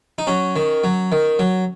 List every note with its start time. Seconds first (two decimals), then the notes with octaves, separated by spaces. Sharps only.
0.18 D#4
0.27 F#3 C#4
0.56 D#3
0.84 F#3
1.12 D#3
1.39 F#3